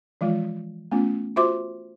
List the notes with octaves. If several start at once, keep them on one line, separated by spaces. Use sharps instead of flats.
E3 F3 G#3 F4
A3 B3 C#4 F4
F4 F#4 C5 E5 C6 D6